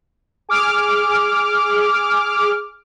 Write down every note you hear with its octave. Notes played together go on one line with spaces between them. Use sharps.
G#4 D6 F6